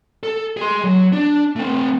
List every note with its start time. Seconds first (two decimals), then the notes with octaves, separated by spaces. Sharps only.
0.23 A4
0.57 G#4 C6
0.84 F#3
1.12 D4
1.56 A3 C4